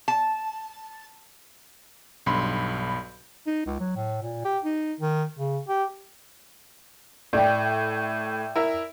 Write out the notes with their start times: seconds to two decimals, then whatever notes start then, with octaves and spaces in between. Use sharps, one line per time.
0.08 A5
2.26 B1 G2 B5 C6
3.46 D#4
3.66 C#2
3.80 F#3
3.96 A2
4.23 A#2
4.45 G4
4.64 D#4
5.00 D#3
5.39 C#3
5.68 G4
7.33 A2 D5 G5
8.56 E4 A#4